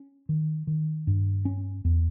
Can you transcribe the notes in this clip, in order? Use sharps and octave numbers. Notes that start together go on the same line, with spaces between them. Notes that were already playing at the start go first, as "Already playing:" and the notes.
Already playing: C#4
D#3
D#3
G2
C#4
E2